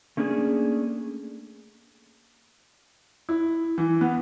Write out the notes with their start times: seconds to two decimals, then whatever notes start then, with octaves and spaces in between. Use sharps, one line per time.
0.17 A3 A#3 C#4 D4 G4 G#4
3.29 E4
3.78 E3
4.01 B3